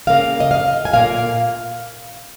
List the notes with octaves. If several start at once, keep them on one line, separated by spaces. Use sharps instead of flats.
C#3 A#3 F5
D#5
F5
G#5
A#2 A#3 F5